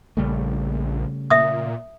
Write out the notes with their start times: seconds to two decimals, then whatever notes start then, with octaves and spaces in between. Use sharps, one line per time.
0.17 A#1 C#3 G3 A3
1.30 A#2 E5 D#6